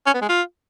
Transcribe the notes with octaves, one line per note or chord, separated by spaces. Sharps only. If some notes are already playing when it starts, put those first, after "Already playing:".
C#4
B3
G#3
F4